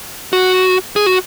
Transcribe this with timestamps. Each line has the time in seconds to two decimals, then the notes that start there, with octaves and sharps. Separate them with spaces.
0.33 F#4
0.96 G#4
1.06 F#4